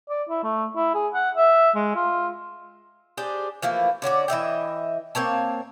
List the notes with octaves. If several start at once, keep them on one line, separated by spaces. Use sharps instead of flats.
D5
E4
A3
E4
G#4
F#5
E5
G#3
F4
D4 G4 G#4 C5
E3 F3 A3 A#3
D3 C#4 F#4 D5
E3 D#5 E5 G5
A#3 C4 C#5 A5